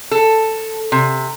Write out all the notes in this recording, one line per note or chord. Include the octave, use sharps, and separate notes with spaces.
A4
C3